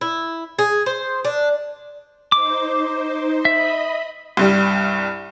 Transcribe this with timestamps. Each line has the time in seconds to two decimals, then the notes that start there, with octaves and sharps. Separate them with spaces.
0.01 E4
0.59 G#4
0.86 C5
1.25 D4
2.32 D#4 C5 D6
3.45 D#5 E5 B5
4.37 C2 G2 G3